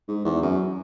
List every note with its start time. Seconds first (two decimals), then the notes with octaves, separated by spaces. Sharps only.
0.08 G#2
0.25 E2
0.42 F#2